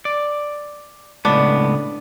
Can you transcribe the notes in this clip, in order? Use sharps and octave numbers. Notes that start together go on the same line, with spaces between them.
D5
C#2 A2 B3 D4